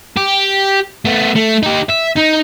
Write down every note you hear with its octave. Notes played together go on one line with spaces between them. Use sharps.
G4
A3 B3
A3
D#4 G4
E5
D#4